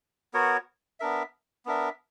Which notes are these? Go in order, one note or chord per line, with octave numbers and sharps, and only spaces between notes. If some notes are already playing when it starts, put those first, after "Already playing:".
B3 F#4 A#4 C#5
B3 D4 A#4 E5
B3 D4 A#4 E5